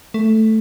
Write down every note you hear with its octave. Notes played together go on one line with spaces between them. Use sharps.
A3